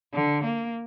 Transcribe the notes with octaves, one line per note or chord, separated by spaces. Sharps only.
D3
A#3